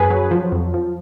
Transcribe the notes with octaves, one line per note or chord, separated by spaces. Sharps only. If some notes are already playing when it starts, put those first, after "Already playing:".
Already playing: F#2 G#4 B4
F#3
F3
F2
F3